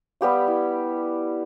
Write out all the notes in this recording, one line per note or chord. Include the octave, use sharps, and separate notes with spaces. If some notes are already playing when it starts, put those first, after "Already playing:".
G3 B3 G4 F5
E4